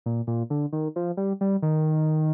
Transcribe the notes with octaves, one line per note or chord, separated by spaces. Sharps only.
A#2
A#2
D3
D#3
F3
G3
G3
D#3